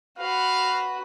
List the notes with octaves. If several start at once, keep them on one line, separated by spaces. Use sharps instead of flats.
F#4 B4 F5